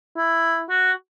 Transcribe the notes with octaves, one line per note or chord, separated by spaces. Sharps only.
E4
F#4